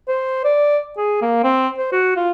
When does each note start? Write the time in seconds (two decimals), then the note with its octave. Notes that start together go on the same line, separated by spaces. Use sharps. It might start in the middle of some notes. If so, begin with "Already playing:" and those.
0.08 C5
0.45 D5
0.98 G#4
1.22 A#3
1.44 C4
1.78 C5
1.92 F#4
2.17 F4